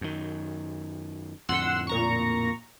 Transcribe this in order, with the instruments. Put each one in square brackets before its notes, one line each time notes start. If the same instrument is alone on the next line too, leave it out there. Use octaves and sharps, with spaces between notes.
[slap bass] F#2 D#3
[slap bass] F2 A2 D3 [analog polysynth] F#5 C6 E6
[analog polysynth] A#2 A#5 C#6